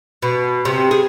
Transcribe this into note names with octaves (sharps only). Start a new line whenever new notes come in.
B2
C3
G#4